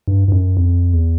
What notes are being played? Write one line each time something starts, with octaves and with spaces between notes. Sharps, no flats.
G2
G2
F#2
F2
E2